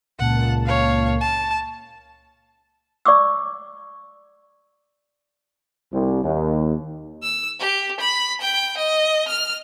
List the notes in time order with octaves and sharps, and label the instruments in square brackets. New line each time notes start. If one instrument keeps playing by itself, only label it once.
[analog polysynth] C#2 A#2 A5 [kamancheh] F#5
[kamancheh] C#5 F5
A5
[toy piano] D5 C#6 D6 E6
[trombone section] C2
D#2
[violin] E6
G4
B5
G5
D#5
F6